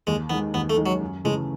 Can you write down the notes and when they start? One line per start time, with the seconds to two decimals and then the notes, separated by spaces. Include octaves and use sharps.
0.07 D#2 G#3
0.30 D#3 G#3 B3
0.54 D#2 B3
0.70 A3
0.77 D#3 G#3
0.86 F#3
1.01 F#2
1.24 C#3 E3 G#3 A3